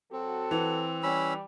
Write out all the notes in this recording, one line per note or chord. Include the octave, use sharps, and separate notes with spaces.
F#3 C4 F#4 A4
E3
G3 C#4 B5 E6